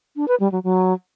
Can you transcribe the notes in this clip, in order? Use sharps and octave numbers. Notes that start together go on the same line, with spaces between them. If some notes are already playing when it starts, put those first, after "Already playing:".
D4
B4
G3
F#3
F#3